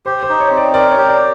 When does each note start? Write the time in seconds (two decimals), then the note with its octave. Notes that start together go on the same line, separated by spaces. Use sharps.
0.06 G4 C5
0.23 C5
0.29 D#4
0.40 C#5
0.51 C4
0.57 D5
0.74 A#4 D5
0.92 G4 C#5
1.09 D5